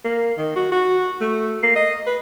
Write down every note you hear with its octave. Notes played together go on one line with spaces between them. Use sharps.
A#3
D#3
F#4
F#4
A3
A#3
D#5
B4